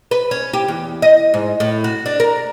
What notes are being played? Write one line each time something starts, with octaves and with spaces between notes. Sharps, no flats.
B4
C#4
G4
E2
D#5
G#2
A2
F#4
D4
A#4